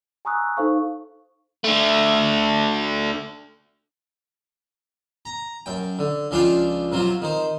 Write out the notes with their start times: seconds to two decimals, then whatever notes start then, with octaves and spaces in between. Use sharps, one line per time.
0.25 G#5 A#5 C#6 D#6 E6 F#6
0.57 D#4 A4 C5 F5 C#6
1.64 D3 A3
5.25 A#5
5.66 F#2 G5
5.99 D3
6.31 C#2 F3 D4 F4 F5 G5
6.92 C3 F#3 C4 F4
7.22 D#3 C5